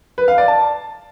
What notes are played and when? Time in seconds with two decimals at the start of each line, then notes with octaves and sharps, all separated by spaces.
0.18 B4
0.28 F5
0.38 D5
0.48 A5